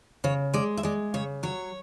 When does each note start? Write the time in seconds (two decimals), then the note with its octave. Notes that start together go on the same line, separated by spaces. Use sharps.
0.24 C#3 C#5
0.54 G#3 D5
0.77 E5
0.83 G#3 D5
1.14 C#3 C#5
1.43 F#3 C#5